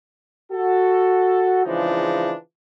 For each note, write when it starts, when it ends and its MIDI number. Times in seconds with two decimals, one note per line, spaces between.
0.52 1.61 66
0.52 1.61 69
1.65 2.33 49
1.65 2.33 52
1.65 2.33 53
1.65 2.33 56
1.65 2.33 62
1.65 2.33 63